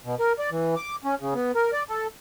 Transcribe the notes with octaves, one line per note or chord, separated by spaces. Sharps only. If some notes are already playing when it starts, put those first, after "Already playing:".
B2
A#4
D5
E3
D6
C#4
C#3
B3
A#4
D5
A4